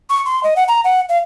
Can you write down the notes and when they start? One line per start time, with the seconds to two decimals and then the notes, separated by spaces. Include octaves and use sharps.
0.10 C#6
0.25 C6
0.43 D#5
0.56 F#5
0.68 A#5
0.84 F#5
1.09 F5